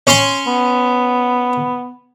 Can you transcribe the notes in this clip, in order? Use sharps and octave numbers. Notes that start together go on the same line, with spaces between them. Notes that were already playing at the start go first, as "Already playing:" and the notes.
C#4 C#5 C6
B3